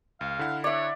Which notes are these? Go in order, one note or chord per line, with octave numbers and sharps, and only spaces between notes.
C#2 F5
D3 E4 F#5
C#5 D5 E5